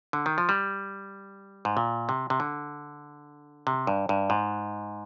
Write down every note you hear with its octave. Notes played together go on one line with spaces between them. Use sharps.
D3
D#3
F3
G3
G#2
A#2
C3
C3
D3
C3
G2
G2
G#2